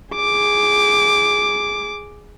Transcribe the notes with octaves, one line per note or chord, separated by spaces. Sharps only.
G#4 D6